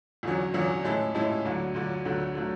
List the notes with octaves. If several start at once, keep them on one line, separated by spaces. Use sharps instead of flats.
E2 D3 F#3 C#4
E2 D3 F#3 C#4
A2 G#3 C#4 E4 A4
A2 G#3 C#4 E4 A4
D2 D3 F#3
D2 D3 F#3
D2 D3 F#3 A3
D3 F#3 A3